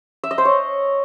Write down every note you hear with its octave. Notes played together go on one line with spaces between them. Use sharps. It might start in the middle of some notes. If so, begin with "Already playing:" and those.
E5
D#5
C5
C#5